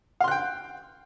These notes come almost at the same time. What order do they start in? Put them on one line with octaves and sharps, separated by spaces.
F5 C6 F#6 G5